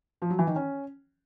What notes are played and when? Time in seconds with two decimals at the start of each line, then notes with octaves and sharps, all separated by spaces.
0.22 F3
0.30 F#3
0.39 E3
0.47 D#3
0.56 C#4